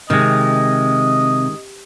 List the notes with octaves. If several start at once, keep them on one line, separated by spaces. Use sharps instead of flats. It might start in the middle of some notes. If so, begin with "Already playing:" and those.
C3 D#3 G#3 D#5